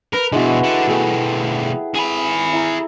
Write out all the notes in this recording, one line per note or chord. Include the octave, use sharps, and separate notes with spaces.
A#4 B4
B2 D3 G#3 E4 F#4
A4 F#5
B2 A3 G#4 A4 G5
G#4 B5
E4 A#5